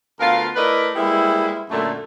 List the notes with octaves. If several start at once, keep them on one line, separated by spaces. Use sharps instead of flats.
D2 B3 F4 A#4 F5
A3 E4 A#4 B4 D5 D#5
G3 G#3 A#3 B3 E4
F#2 A#2 D3 A3